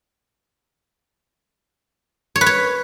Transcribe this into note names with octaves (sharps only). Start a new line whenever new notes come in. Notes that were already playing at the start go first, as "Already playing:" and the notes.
C#5
B4
C#5